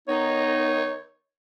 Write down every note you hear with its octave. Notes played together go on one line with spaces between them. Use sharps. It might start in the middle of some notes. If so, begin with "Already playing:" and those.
D#3 B3 D#4 C#5